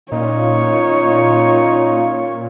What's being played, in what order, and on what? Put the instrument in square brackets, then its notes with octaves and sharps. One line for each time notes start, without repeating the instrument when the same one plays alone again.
[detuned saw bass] A#2 [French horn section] C#4 F4 [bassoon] D#4 [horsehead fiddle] C#5